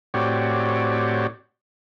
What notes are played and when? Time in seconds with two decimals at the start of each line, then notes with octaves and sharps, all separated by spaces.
0.14 A2 C4 F#4 G4 C#5 D5